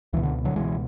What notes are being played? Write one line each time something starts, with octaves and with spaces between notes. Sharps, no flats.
C#2 B2 E3
D3
D3 F#3
C#2 B2 E3 G#3